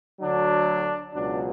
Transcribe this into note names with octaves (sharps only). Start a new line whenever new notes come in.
D2 D3 F#3 D4
C#2 B2 F#3 D4